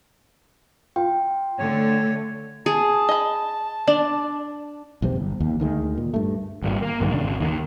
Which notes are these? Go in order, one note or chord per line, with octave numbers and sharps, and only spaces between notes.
F4 G5
D3 A3 C#5
G#4 A5
D#5 B5
D4 D5
B1 E2 C3 C4
G1
D#2
D2 D#3 E3 G#3
A#2
G2 A3
G#1 G2 A#2
A#3
A#1 G2 D3 D#3
E1 C#3 D4
G#1
D#2 C3 D#3